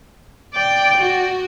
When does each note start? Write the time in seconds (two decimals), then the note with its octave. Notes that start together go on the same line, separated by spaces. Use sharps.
0.53 D5 G5
0.98 F#4